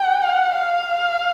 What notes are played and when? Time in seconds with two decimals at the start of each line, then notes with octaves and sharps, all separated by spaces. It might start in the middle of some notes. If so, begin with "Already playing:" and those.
Already playing: G5
0.22 F#5
0.56 F5